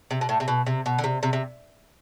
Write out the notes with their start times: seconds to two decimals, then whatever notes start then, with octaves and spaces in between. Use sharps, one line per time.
0.11 C3
0.21 B2
0.29 A2
0.40 C3
0.48 B2
0.66 C3
0.86 B2
0.99 D3
1.04 C3
1.23 C3
1.33 C3